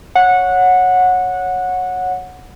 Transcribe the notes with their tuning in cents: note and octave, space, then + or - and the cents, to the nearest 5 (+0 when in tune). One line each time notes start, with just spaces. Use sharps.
C#5 +0 F#5 -15